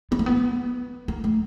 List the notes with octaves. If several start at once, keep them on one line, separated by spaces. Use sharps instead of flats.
B3
A#3
B3
A#3
A3